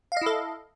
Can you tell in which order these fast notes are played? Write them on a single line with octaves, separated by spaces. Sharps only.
F5 D#5 E4 A4